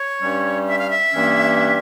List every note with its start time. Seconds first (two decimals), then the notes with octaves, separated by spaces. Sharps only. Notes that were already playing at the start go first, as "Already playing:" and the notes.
Already playing: C#5
0.21 G2 G3 C#4
0.67 E5
0.79 F5
0.90 E5
1.12 G2 E3 A#3 C#4